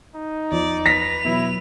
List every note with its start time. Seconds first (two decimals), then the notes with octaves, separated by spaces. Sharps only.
0.15 D#4
0.52 E2 F3 D5
0.86 B4 A#6 B6 F7
1.25 B2 E3 F#3 E4